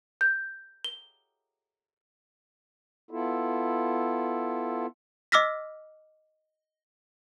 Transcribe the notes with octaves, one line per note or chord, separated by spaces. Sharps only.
G6
G7
B3 E4 F4 A4
D#5 D6 E6 F6 A#6 B6